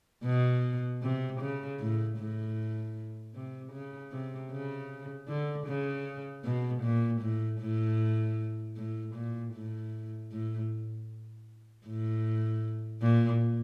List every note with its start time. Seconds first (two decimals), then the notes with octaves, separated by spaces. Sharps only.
0.24 B2
1.02 C3
1.40 C#3
1.79 A2
2.18 A2
3.34 C3
3.72 C#3
4.11 C3
4.51 C#3
5.28 D3
5.67 C#3
6.44 B2
6.83 A#2
7.21 A2
7.60 A2
8.76 A2
9.14 A#2
9.53 A2
10.31 A2
11.86 A2
13.02 A#2